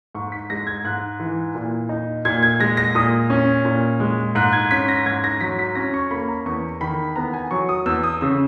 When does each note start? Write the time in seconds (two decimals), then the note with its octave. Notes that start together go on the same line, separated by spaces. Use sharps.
0.15 G#2 C#6
0.32 B6
0.50 G#3 A#6
0.67 G#6
0.84 G#2 F#6
1.20 E3
1.55 A#2
1.89 D#4
2.25 A#2 G#6
2.43 G#6
2.60 G#3 A#6
2.77 A#6
2.95 A#2 D#6
3.30 C#4
3.65 A#2
4.00 G#3
4.35 G#2 F#6
4.53 G#6
4.71 C#4 B6
4.88 A#6
5.06 G#2 G#6
5.24 A#6
5.41 F#3 B6
5.59 B6
5.75 C#4 A#6
5.94 C#6
6.11 A#3 B5
6.28 A#5
6.45 E2 C#6
6.81 D#3 B5
7.16 B3 A#5
7.34 G#5
7.51 F#3 C#6
7.69 D#6
7.86 E2 E6
8.03 D#6
8.21 C#3 E6